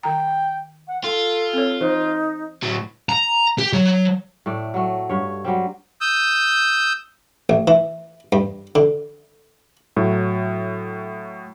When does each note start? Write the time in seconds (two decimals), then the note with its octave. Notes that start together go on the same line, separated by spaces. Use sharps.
0.03 D#3 G5 A#5
0.88 F#5
1.04 F4 A4
1.53 C4 C#5
1.81 E3 D#4 C5
2.62 A2 F#3
3.09 A#5
3.58 G4
3.73 F#3
4.46 A2 A3 D5
4.74 F#3 A3
5.09 G2 C#5
5.45 F#3 G3 C4
6.01 D#6 E6 G6
7.49 A1
7.68 E3
8.32 G2
8.75 D3
9.97 A2 F#3